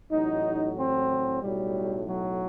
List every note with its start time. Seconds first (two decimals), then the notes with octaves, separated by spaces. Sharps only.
0.11 A1 A2 F#3 D#4
0.77 C4
1.41 B1 A2 F#3 G3
2.06 F#3